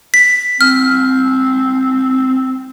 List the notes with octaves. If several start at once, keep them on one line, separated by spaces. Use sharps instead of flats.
B6
C4 F6